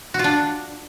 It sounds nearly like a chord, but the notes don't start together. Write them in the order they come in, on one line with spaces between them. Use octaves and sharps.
F#4 F4 D4